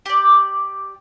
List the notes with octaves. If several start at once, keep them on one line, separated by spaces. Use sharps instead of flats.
G4 D5